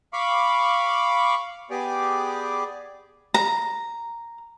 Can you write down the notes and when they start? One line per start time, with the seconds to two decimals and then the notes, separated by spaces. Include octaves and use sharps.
0.13 F5 B5 C#6 D6
1.71 B3 G4 G#4 D5
3.34 A#5